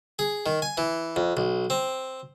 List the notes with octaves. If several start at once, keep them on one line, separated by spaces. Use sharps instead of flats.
G#4
D#3
G#5
E3
F2
B1
C4